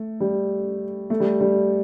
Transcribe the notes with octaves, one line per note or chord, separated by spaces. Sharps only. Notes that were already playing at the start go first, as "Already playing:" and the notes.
Already playing: A3
G3
A3
G3
G3